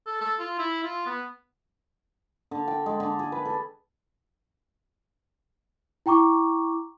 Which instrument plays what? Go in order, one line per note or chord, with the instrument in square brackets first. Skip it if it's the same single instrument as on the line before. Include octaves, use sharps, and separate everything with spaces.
[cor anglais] A4
A4
F4
E4
F4
B3
[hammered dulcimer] D3
G5
G#3
D3
G#4
B4
A4
[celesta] E4 G5 A#5 C#6 D6